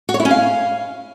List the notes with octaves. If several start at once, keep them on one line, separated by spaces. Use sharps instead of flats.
F#4
C#5
E4
C#4
F5